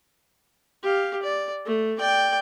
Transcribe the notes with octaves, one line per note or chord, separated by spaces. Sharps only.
G4 F5
D5
A3
D5 G5